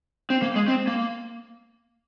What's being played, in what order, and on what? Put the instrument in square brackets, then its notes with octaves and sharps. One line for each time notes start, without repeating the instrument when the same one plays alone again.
[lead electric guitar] C4
A#3
G#3
C4
A#3